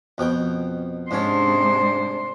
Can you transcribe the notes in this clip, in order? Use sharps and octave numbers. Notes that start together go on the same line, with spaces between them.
F2 B2 G5
G#2 C3 G#3 C#4 D4 C5